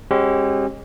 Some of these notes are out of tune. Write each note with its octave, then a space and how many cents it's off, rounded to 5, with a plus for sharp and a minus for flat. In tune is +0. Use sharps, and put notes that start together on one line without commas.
G#3 -25 C#4 -45 G4 -35